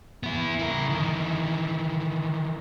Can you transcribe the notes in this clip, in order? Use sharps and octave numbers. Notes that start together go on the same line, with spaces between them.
B3 E4
E4 A#4
D#3 E3